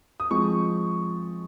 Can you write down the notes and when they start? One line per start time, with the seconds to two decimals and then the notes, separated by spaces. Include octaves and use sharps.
0.20 D#6
0.31 F3 G#3 C4 C#6